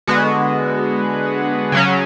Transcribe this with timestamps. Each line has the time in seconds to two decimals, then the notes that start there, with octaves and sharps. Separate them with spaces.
0.07 D3 G#3 B3 F#4
1.72 C#3 F#3 C#4